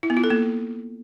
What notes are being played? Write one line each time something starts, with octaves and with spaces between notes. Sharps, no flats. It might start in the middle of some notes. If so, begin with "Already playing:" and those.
E4
B3
F4
A4
A#3